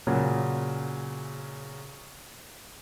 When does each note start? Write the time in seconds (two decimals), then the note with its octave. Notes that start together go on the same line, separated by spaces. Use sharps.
0.07 A#2 C#3 F#3